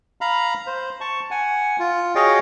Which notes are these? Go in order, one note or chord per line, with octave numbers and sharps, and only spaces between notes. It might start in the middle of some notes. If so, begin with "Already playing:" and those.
F5 A#5 B5
C5
A5 C#6
F#5 G#5
F4
F#4 G#4 C#5 D#5 F5 G5